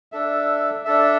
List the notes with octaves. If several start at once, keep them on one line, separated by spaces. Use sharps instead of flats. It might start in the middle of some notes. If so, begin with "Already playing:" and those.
D4 A4 E5
D4 A4 E5